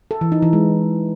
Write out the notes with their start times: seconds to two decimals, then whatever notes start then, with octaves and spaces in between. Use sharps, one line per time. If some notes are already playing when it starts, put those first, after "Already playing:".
0.11 A4
0.21 E3
0.32 D#4
0.42 E3
0.53 G#3